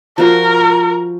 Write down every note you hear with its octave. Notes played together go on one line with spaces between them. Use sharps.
F3 F#4 A#4